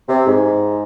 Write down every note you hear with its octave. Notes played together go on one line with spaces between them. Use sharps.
C3
G#2